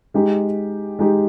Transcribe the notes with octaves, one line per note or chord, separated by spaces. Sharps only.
G#3 D#4 G4
G#3 D#4 G4